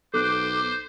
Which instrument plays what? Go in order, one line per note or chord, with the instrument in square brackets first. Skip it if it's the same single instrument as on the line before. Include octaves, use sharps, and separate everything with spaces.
[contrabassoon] B1 [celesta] A4 F#6 [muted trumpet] C5 [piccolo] D6